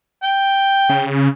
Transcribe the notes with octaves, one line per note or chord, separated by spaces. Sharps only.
G5
C#3